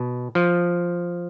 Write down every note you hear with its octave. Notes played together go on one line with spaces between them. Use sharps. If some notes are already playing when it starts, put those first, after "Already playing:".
Already playing: B2
F3